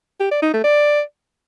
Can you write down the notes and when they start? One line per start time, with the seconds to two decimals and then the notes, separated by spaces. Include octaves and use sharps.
0.20 G4
0.31 D5
0.42 D#4
0.53 A3
0.64 D5